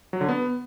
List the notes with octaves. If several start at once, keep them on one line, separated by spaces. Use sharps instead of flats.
F#3
D3
B3